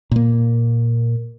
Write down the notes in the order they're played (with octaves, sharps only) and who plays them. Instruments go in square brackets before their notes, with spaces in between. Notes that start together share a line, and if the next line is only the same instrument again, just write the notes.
[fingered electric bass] A#2 A#3